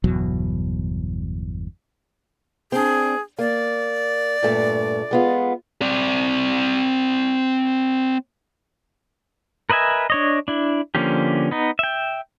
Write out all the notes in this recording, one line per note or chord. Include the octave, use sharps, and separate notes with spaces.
G1 E2 B2 F#3
C4 D4 G#4
A#3 D5
G2 A#2 A3
G#3 B3 F4
C4 D5
A#4 B4 D#5 E5 G#5
D4 C#5 D#5
D4 E4
D3 F3 A#3 C#4 G4
B3 D#4
E5 G5